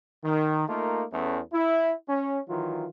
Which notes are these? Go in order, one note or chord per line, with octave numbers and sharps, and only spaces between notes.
D#3
A3 A#3 D#4 F4 A4 A#4
E2 A3 C#4
E4
C#4
D#3 E3 F#3 F4